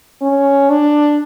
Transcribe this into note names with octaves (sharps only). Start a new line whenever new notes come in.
C#4
D4